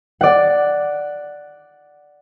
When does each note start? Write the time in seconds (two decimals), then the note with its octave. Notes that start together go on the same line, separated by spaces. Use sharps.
0.21 D5 F#5